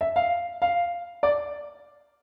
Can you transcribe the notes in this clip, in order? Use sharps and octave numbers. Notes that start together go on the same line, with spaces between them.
E5
F5
F5
D5